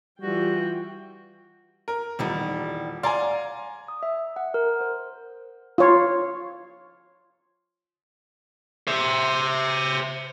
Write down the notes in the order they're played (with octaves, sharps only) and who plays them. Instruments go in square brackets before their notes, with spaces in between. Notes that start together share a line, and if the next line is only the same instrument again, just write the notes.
[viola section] E3 F4 G5 [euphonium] G3 [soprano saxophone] F#4
[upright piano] A#4
[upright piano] D#1 [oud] E2 G3 D#4
[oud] D5 F5 [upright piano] G#5 A#5 C6
[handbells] D#6
E5
F#5
A#4
C5
[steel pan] F4 C#5
[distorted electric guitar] C5 E5